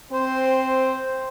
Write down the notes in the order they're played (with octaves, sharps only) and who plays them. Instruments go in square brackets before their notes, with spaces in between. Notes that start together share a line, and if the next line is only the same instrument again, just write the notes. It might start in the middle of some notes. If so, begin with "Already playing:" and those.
[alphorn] C4 [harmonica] C5